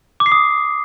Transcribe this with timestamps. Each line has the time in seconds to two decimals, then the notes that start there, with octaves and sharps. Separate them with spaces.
0.20 D6
0.26 C7
0.32 D#6